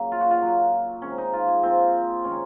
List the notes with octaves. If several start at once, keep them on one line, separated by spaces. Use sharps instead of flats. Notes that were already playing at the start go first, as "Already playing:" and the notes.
Already playing: C#3 F#3 A#3
F4
F#4
F4
A#2 F#3 A#3
C3 D#3 G#3 C#4
D#4
F4
G#4
A#2 F3 A#3 C4
C3 D#3 G#3 C#4